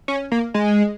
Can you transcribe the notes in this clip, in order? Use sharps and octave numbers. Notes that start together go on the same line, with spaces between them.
C#4
A#3
G#3